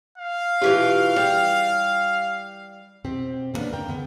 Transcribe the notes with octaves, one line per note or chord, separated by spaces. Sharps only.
F5
B2 E3 F4 G4
G3
B2 C4 G4
D3 G3 A#3 B3 C#4 D4
D2 G2 A#4 G5
C#3 B3